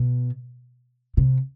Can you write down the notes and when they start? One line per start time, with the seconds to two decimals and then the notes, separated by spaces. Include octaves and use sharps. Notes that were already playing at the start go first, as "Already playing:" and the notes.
Already playing: B2
1.17 C3